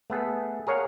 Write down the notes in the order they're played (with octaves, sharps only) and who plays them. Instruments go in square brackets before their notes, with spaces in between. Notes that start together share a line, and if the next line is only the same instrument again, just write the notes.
[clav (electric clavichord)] A3 B3 G#4 A4
G#4 A#4 C#5 F5 F#5